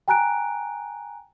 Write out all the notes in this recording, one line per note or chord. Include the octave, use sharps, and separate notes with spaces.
G5 G#5 A#5 F#6 D7